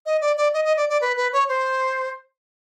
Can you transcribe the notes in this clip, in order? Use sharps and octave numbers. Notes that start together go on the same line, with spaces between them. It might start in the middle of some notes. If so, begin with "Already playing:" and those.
D#5
D5
D5
D#5
D#5
D5
D5
B4
B4
C#5
C5